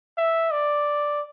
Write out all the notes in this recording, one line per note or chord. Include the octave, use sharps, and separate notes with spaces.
E5
D5